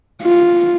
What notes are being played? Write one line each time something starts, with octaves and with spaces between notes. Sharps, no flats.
F4